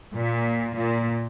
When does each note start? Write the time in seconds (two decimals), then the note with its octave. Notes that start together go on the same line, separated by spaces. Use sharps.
0.15 A#2
0.76 A#2